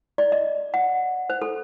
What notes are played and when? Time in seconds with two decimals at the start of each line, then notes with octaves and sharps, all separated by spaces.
0.18 D5
0.32 D#5
0.74 F#5
1.30 C5
1.42 A4